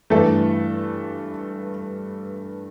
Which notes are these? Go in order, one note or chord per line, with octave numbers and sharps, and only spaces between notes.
G2 E3 A3 A4